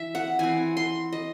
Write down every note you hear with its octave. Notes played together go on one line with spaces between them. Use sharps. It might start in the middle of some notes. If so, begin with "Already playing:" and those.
Already playing: E3 E5
F#5
E3 C4 G#5
C6
D#5